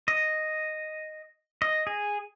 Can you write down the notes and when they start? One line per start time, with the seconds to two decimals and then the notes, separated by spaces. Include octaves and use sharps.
0.08 D#5
1.62 D#5
1.87 G#4